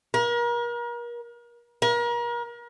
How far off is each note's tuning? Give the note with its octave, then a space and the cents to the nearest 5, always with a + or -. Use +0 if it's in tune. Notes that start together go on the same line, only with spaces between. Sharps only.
A#4 +35
A#4 +35